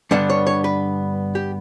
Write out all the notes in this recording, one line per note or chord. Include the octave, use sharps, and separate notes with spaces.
G2 D3 G3 B3 D4 F#5
C#5
C#5
B4
G4